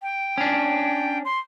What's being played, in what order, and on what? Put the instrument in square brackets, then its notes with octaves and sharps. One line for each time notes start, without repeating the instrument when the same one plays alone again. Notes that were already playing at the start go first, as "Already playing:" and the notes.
[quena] G5
[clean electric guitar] C#4 D4
[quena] C6